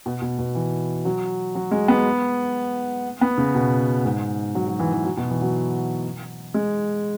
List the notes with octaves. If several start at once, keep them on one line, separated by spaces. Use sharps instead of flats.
B2
B2
B2
E3
F#3
F#3
G#3
B3
B3
C#3
B2
G#2
F#3
F#3
E3
E3
F#3
B2
E3
F#3
G#3